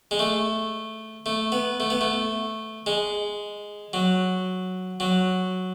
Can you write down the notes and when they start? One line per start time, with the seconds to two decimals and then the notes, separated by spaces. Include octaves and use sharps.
0.11 G#3
0.19 A3
1.26 A3
1.52 B3
1.80 A3
1.90 B3
2.01 A3
2.86 G#3
3.93 F#3
5.00 F#3